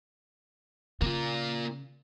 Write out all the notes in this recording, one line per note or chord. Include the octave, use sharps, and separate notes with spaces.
C#3 A#3 F4